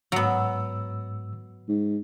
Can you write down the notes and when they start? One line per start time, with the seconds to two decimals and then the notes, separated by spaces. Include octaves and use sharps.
0.12 G#2 F#3 B3 E6
1.68 G#2